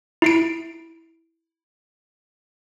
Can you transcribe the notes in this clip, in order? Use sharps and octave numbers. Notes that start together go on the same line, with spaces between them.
E4 C7 D7